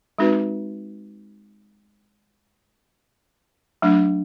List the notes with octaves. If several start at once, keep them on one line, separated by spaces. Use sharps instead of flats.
G#3 C4 D#4 F#4 B4
F#3 A3 D4